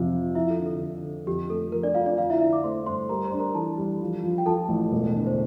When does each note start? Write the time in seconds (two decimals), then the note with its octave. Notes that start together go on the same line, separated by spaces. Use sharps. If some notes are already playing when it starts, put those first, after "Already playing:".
Already playing: F2 C3 F3 F4 F5
0.13 F3
0.35 F3 E4 E5
0.50 A4
0.59 D3
0.66 A4
0.80 D3
1.04 D3
1.27 F2 G4
1.50 A3 A4
1.72 F2 A#4
1.83 D4 D5
1.95 F2 F4 F5
2.06 D4 D5
2.17 D3 F4 F5
2.30 E4 E5
2.40 D3 E4 E5
2.52 D5 D6
2.64 A3 C5 C6
2.86 G2 C5 C6
3.09 G3 A#4 A#5
3.25 C5 C6
3.32 D4
3.39 A#4 A#5
3.54 E3 A4 A5
3.77 G3
4.01 F3
4.23 F3
4.38 G5
4.46 F3 A4 A5
4.69 A1
4.92 E1
5.15 D3
5.27 C5